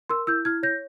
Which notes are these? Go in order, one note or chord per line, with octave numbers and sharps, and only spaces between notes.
A#4 C6 E6
E4 E6 G6
E4 F6 G#6
C#5 G6 A#6